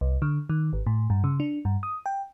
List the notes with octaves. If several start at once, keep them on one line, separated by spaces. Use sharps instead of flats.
C2
D3
D#3
G#1
A2
G2
C#3
D4
G2
D#6
G5